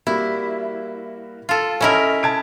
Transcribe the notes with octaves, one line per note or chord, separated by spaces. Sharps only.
G3 A#3 E4 F#4
F4 A4
C#4 E4 A4 A#4 D#5
A5 G#6 D7